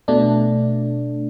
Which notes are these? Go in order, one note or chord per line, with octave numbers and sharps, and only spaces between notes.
B2 A3 D4